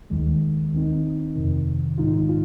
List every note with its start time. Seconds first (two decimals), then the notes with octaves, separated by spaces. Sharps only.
0.10 D#2 D#3 G#3
0.73 D#2 D#3 C4 D#4
1.35 F2 C3 D#3
1.97 A#1 G#2 D#3 G#3 D#4 F4
2.29 F4